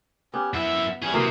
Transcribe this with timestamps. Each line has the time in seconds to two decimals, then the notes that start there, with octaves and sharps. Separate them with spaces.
0.34 B3 C#4 G4
0.54 F#2 E4 E5
1.02 E3 G3 C#4 G#4 C#6
1.14 C3 E3 F#3 A#3 D#6